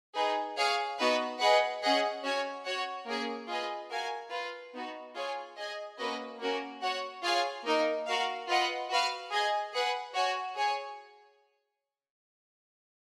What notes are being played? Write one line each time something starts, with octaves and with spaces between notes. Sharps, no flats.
D#4 G#4 B4
G#4 C#5 F5 G#5
B3 D#4 F#4 B4
G#4 B4 D#5 F#5
C#4 G#4 D#5 F#5
C#4 F#4 C#5 G#5
F#4 C#5 F#5
A#3 C#4 G#4
F4 G#4 B4 D#5 G#5
F#4 A#4 F5 G#5
F4 B4 F5
B3 D#4 F#4
F4 G#4 C#5 G#5
G#4 D#5 G#5
A#3 C#4 F#4 B4 D#5
A#3 C#4 F#4 A#4
F#4 C#5 F#5
F4 G#4 C#5 F5 G#5
A#3 D#4 A#4
F#4 A#4 F5
F4 B4 D#5 F#5
F#4 B4 F5
G#4 D#5 G#5
G#4 B4 F#5
F#4 C#5 G#5
G#4 C#5 G#5